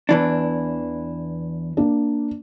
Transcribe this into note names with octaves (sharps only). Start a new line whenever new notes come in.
E2 E3 D4
A#3 D4